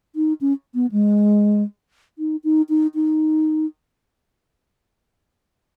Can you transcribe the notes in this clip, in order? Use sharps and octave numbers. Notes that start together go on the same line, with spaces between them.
D#4
C#4
B3
G#3
D#4
D#4
D#4
D#4